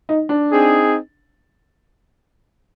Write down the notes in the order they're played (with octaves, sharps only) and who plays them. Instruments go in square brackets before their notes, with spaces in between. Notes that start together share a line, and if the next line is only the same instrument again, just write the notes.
[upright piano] D#4
D4
[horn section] C4 D#4 G#4